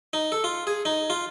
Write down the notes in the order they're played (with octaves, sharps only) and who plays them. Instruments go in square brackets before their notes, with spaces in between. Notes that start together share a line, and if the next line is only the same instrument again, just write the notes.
[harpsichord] D#4
A4
F4
G#4
D#4
F4